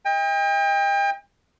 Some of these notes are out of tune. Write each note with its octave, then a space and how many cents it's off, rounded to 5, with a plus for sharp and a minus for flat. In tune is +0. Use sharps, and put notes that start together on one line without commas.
D#5 +30 G5 +35